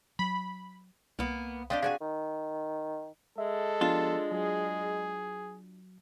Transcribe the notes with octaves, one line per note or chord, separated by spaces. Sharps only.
F#3 B5
C2 A#3 B3
C4 D4 G4 D5 D#5 F5
D4 F#4 G#4 F5 G5 G#5
D#3
G#3 A4 E5
F3 B3 D4 F4 G4
F#3 G#4